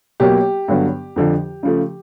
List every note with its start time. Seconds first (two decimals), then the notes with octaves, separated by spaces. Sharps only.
0.20 B2 F#3 A#3 G4
0.68 G2 D3 F#3 B3
1.16 F2 D3 F3
1.63 C#3 F3 A3